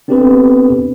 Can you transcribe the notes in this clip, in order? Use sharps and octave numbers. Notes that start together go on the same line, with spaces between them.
B3 C4 D4 G4 A4 B4